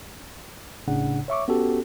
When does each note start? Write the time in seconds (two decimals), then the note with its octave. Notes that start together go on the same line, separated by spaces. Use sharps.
0.88 G1 A2 C#3 D4 F#5
1.28 C#5 E5 C#6 D6
1.48 B3 C#4 F#4 G4 A4